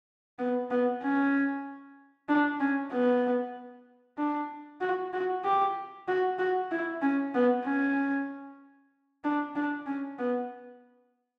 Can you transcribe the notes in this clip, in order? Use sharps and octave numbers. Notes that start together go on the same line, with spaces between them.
B3
B3
C#4
D4
C#4
B3
D4
F#4
F#4
G4
F#4
F#4
E4
C#4
B3
C#4
D4
D4
C#4
B3